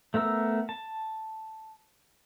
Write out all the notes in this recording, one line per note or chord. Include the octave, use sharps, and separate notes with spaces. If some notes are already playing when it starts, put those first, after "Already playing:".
A3 B3 A#4 E6
A5